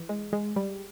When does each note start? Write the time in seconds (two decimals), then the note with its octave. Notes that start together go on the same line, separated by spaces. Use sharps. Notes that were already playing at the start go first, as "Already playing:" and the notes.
Already playing: E3
0.09 G#3
0.33 G#3
0.56 G3